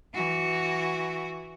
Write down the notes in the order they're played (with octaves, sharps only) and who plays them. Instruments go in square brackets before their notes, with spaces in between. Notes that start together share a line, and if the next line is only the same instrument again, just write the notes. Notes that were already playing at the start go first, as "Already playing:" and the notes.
[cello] E3 F#4